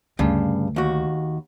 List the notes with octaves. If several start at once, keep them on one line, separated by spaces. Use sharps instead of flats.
D2 G2 C#3
D#2 F#4